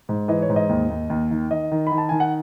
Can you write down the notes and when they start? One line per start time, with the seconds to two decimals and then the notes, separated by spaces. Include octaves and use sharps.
0.09 G#2
0.28 E3 D#5
0.42 C#5
0.49 G#2
0.56 D#5
0.69 D#2
0.90 D#2
1.10 D#2
1.31 D#3
1.50 D#3 D#5
1.72 D#3
1.87 D#3 B5
1.98 A5
2.09 D#3 G#5
2.20 F#5